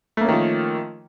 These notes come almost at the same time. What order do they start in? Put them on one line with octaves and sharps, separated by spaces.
A3 A#3 C#4 D#3 F3